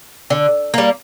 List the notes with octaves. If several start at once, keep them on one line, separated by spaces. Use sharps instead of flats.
D3
G3 A#3